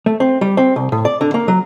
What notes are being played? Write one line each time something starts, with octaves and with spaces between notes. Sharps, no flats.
A3
C4
G3
C4
C2
A2
D5
D3
A#3
F#3